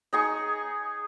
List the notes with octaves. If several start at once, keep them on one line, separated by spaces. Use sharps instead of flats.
D#4 G#4 C#6